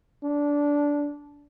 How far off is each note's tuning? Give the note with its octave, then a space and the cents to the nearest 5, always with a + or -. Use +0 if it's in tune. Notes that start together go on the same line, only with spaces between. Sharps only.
D4 -15